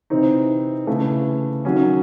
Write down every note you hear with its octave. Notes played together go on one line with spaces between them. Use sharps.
C3 E3 C4 D#4
C#3 E3 A3
D#3 F#3 C#4